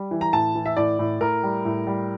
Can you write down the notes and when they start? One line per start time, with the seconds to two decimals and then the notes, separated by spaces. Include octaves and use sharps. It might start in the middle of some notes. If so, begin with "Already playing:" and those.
Already playing: G3
0.11 E3
0.21 A#5
0.33 A2 A5
0.55 E3
0.66 E5
0.77 A2 D5
0.99 A2
1.21 A2 A#4
1.43 G3
1.65 A2
1.87 G3